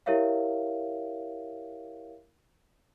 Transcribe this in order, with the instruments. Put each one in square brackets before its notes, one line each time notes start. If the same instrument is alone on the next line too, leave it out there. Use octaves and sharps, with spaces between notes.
[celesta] E4 G4 A#4 C#5 E5 F5